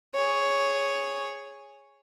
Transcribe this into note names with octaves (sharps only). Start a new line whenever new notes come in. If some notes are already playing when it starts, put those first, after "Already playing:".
G#4 C#5